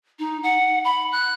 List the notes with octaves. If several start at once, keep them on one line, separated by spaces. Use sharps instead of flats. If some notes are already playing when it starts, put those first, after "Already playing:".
D#4
F#5
B5
F#6